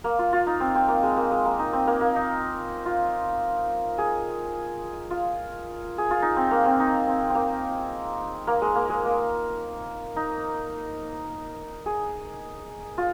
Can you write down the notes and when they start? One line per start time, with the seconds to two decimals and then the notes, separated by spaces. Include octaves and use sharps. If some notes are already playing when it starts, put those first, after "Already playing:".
0.04 A#3
0.19 F4
0.33 F4
0.47 D#4
0.60 C4
0.75 C4
0.88 A#3
1.03 G#3
1.17 A#3
1.31 G#3
1.45 A#3
1.59 D#4
1.73 C4
1.87 A#3
2.01 A#3
2.16 D#4
2.86 F4
3.98 G#4
5.11 F4
5.98 G#4
6.11 F4
6.22 D#4
6.36 C4
6.51 A#3
6.66 C4
6.80 D#4
7.07 C4
7.30 A#3 C4
8.47 A#3
8.62 G#3
8.75 A#3
8.90 G#3
9.05 A#3
10.16 D#4
11.86 G#4
12.98 F4